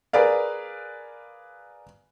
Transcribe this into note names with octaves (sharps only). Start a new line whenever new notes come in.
G#4 A#4 B4 D5 F5